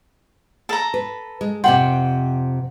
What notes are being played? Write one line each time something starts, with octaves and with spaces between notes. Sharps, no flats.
A4 A#5
B4
G#3
F2 A2 C3 F#5 G5 C6